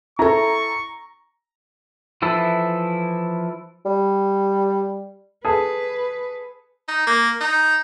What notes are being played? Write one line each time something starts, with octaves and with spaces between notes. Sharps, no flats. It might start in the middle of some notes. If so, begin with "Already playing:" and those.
E4 A4 A#5 C#6
E3 F3 E4 A4
G3
G#4 A4 B4
D#4
A#3
D#4